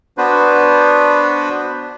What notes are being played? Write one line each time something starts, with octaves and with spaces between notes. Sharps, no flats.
B3 D4 F#4 B4 C5